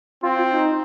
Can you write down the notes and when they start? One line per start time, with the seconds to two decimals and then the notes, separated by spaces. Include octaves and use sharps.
0.23 C4 F4
0.38 F4
0.52 D#4